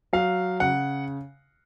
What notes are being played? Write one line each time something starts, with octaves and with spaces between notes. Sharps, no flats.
F#3 F5
C#3 F#5